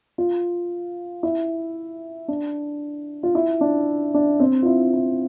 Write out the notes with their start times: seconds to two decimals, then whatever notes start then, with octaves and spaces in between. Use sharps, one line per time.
0.18 F4
1.23 E4
2.28 D4
3.23 F4
3.35 E4
3.61 D4
4.14 D4
4.40 C4
4.63 F4
4.66 E4
4.93 E4